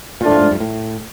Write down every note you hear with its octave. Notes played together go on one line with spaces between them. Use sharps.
A#2 F3 A3 D4 F4
A2
G#2
G2
A2